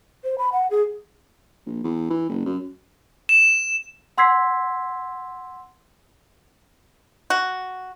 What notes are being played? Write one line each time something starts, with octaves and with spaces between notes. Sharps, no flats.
C5
B5
F#5
G#4
A#1
E2
E3
F#1
F#2
E7
F#5 C6 E6 G#6 B6 C7
F#4